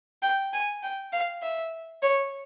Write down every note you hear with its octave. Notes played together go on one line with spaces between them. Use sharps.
G5
G#5
G5
F5
E5
C#5